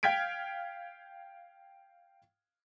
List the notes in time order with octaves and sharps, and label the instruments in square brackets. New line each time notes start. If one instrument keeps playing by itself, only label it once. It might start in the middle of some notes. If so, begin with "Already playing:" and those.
[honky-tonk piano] F5 G5 F6 G#6 B6 D7